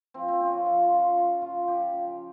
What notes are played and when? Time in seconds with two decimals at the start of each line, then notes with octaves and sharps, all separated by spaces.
0.14 F3 C4
0.28 C4
0.40 C#3 C#4
0.54 F4
0.66 F3 F4
0.83 F4
0.92 C#3
0.99 F4
1.16 F3 F4
1.42 C#3 F4
1.68 F3 G4
1.93 C#3